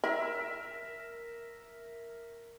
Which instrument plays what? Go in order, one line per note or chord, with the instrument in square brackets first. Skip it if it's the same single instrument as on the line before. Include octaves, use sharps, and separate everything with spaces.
[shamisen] E4 [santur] A#4 E5